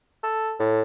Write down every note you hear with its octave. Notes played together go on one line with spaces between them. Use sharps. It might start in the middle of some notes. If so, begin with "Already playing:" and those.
A4
A2